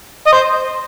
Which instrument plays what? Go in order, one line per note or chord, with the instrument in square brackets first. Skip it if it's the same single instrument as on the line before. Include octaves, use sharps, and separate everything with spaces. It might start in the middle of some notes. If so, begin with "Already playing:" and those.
[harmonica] D#5
C5